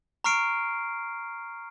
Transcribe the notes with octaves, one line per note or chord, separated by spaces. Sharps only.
A#5 C#6 F6 C7 D7